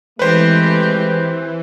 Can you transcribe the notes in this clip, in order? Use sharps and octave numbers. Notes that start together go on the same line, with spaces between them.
E3 G#3 A3 C4 G4 B4 C5